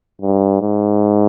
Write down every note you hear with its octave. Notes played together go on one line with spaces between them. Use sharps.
G2
G#2